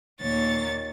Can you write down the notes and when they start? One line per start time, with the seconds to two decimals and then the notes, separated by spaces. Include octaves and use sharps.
0.20 D#2 A#2 C#5 A6